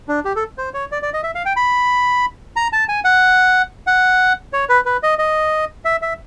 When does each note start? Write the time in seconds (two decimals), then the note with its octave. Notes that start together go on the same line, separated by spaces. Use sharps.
0.08 D4
0.25 G4
0.36 A4
0.58 C5
0.74 C#5
0.92 D5
1.02 D5
1.14 D#5
1.23 E5
1.35 F5
1.45 G5
1.56 B5
2.56 A#5
2.73 A5
2.89 G#5
3.04 F#5
3.87 F#5
4.53 C#5
4.69 B4
4.85 B4
5.03 D#5
5.19 D#5
5.85 E5
6.02 E5